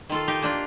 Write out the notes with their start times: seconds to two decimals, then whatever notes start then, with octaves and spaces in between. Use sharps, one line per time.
0.10 D#3 F4 A4
0.28 D#4 G4
0.42 A#3 D4 F4